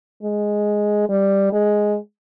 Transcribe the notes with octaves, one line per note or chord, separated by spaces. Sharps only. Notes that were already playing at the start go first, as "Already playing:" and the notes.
G#3
G3
G#3